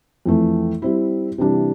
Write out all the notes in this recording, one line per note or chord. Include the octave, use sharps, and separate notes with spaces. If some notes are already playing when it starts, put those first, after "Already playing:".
F2 E3 A3
G3 C4 E4
C3 E3 G3 D4